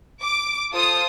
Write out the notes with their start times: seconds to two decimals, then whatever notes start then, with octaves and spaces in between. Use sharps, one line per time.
0.23 D6
0.72 F4 A4 C5 D#6